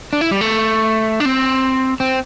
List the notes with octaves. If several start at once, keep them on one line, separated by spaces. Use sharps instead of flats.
D4
E4
G3
A3
D4
C4
C4